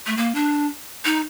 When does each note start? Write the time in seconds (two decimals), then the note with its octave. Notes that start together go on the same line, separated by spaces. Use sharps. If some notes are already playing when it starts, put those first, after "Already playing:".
0.06 A3
0.17 A#3
0.35 D4
1.05 D#4